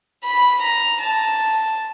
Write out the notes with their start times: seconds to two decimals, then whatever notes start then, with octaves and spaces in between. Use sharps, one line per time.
0.24 B5
0.62 A#5
1.01 A5